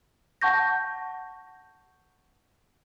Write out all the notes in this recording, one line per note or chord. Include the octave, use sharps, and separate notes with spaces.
F#5 A5 C#6 G6 A#6